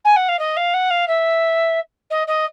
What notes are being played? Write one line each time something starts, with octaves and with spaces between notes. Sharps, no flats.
G#5
F#5
F5
D#5
F5
F#5
F5
E5
D#5
D#5